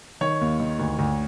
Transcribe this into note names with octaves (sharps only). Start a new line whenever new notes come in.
D#3 C#5
D#2
D#3
D2
D2